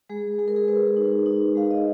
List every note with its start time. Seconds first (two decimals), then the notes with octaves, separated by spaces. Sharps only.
0.09 G#3 G#4
0.39 G#3 G#4
0.48 A#4
0.56 G#4
0.68 G#3 B4
0.97 D#4
1.26 D#4
1.55 G#3 F5
1.71 D#5